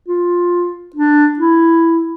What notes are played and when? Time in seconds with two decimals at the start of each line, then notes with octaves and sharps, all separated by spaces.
0.08 F4
0.95 D4
1.39 E4